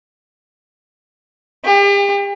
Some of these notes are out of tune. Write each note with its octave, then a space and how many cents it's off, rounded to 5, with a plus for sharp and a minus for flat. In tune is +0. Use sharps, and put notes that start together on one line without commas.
G4 +40